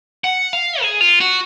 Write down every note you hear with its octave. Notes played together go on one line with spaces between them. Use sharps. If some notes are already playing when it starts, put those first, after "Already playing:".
F#5
F5
G#4
F4
F#4